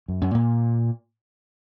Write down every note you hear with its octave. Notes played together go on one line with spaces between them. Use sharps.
F#2
F#2
A#2